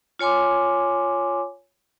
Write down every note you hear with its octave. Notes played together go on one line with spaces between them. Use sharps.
F4 C#5 G#5 C6 D6